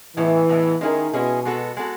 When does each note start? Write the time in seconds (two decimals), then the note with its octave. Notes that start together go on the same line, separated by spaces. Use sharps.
0.16 A2 E3 G#3 B3 E4
0.49 A2 G#3 B3 E4
0.80 D#3 G#3 C#4 E4 G#4
1.13 B2 G#3 C#4 E4 G#4
1.45 G#3 B3 F#4 A4
1.77 G#3 B3 F#4 A4